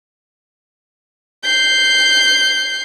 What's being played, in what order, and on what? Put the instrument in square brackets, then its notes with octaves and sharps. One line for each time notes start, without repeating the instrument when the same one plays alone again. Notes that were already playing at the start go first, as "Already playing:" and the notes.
[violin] G6 C7